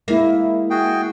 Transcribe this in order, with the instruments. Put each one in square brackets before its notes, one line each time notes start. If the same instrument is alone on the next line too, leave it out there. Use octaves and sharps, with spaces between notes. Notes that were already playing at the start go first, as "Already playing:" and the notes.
[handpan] G#3 E4 [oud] A#3
[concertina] F#4 G#4 G5